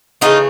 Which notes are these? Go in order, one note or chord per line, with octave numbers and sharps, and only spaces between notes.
C#3 E3 A3 D#4 F4